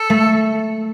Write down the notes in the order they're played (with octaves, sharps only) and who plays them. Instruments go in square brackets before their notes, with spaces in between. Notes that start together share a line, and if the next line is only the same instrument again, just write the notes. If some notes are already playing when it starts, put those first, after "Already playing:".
Already playing: [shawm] A4
[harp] A3